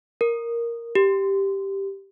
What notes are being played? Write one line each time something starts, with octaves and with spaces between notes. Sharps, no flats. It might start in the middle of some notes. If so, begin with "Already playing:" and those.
A#4
G4